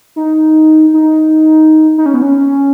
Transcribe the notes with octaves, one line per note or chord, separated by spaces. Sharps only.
D#4
D#4
D#4
C#4
B3
C#4